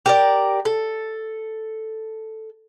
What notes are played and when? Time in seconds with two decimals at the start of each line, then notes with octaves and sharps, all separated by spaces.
0.06 G4 A#4 D5
0.65 A4